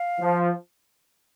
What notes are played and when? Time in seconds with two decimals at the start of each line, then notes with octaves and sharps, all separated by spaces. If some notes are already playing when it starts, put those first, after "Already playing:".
Already playing: F5
0.20 F3